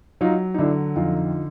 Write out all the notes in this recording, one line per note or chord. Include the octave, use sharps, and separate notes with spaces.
F#3 D#4 F4
D#4
D3 D4 E4
F2 D#4 F4